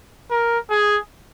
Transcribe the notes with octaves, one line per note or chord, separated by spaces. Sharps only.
A#4
G#4